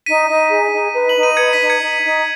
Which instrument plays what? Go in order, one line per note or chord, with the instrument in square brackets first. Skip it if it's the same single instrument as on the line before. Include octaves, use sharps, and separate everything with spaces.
[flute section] D#4 [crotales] B6 D#7
[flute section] D#4
G#4
D#4
B4
[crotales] F#7
[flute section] D#4
[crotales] D#7
[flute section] B4 [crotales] G#6 C#7
[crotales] B6
[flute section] D#4
[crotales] G#6 C#7
[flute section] D#4
D#4